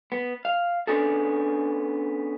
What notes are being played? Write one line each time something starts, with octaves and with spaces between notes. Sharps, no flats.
B3
F5
B3 C#4 D4 G#4 A4